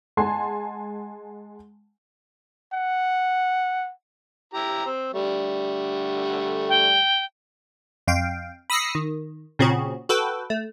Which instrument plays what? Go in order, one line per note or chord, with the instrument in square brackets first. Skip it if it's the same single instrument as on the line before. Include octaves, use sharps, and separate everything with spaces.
[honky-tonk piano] G#3 F#5 G#5 A5 C6
[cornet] F#5
[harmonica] E4 G4 A#5
C4
D3 G3 A3
[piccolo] G5
[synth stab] F2 F5 G5
B5 D#6 E6 A#6 C7 C#7
D#3
A#2 C#3 C4 C#4 F#4 G#4
F#4 A4 B4 G5
A3